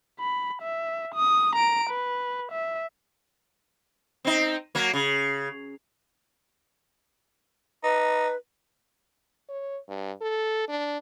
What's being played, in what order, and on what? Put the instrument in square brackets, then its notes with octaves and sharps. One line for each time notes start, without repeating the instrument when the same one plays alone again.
[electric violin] B5
E5
D#6
A#5 D7
B4
E5
[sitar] C4 D#4
F#3 A#3
C#3
[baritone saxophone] D#4 [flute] B4
[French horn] C#5
G2
A4
D4